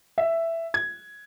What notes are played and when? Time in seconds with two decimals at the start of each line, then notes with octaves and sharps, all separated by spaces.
0.18 E5
0.74 G#6